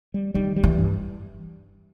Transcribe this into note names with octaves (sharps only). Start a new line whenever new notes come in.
G3
D#3 G3
G3
E3
G2